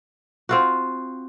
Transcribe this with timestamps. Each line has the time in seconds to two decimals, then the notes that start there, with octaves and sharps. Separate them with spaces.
0.49 C4 F4 F#4